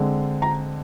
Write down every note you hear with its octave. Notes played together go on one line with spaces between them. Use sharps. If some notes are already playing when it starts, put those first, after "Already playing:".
Already playing: D3 G#3 C4
A#5